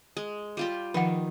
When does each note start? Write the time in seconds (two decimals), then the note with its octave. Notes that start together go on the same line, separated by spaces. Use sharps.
0.17 G#3
0.57 G3 F4 G4
0.94 D#3 F3 F#5